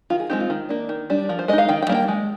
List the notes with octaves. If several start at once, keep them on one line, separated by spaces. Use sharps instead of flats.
D#3 F4
G#4
G#3 C4 D#4 G4
F4
D#3
A#3 D4
D#3
G3 D4
F3 A#4
C5
G#3 D#4 D#5
F5
D#3 G5
G5
G3 A#3 D4
G5
G#3